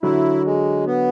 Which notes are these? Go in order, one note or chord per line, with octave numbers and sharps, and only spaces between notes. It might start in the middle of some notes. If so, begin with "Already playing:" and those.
D3 F#3 E4
G#3
B3